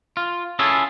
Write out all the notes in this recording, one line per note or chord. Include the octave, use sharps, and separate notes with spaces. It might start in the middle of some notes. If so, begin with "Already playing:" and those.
F4
C#4 E4 F4 G#4 A4